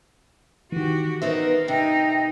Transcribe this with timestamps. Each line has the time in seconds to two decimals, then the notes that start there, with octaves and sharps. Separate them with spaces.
0.72 D#3 E3 F#4 G4
1.22 B3 D#4 A#4 C5 E5
1.68 C3 D#4 G5